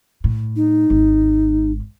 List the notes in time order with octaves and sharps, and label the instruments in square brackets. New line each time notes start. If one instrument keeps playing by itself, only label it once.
[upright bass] A2
[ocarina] D#4
[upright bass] G#1 G#3